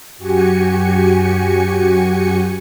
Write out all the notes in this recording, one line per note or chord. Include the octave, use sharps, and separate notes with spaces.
F#2 F#4 G4 G#5 C#7